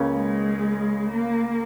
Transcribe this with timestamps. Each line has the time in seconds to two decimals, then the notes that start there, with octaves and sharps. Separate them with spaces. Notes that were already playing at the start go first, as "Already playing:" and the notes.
Already playing: C#2 C#3 A#3 C#4
0.13 G#3
1.10 A#3